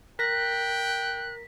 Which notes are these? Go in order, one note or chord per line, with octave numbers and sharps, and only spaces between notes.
A#4 G5 F#6 A#6 B6